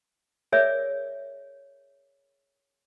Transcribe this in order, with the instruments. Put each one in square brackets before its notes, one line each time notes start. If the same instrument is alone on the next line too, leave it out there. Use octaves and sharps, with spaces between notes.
[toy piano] G#4 A#4 C#5 D5 E5